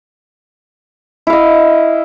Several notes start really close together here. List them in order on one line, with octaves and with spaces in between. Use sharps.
E4 F5 D#5